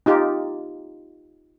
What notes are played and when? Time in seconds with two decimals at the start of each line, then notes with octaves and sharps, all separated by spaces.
0.06 D#4 F4 G4